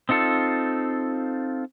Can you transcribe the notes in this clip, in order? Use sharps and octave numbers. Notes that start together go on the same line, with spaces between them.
C4 D#4 F4 A4